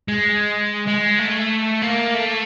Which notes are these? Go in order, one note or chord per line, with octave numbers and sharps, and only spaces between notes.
G#3
G#3
A3
A#3
A3